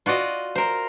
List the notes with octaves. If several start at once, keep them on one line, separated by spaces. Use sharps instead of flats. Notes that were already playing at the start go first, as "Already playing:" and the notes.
F4 F#4 D5 D#5
A#4 C5